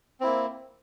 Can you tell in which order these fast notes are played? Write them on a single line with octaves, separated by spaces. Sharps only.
C4 E4 A#3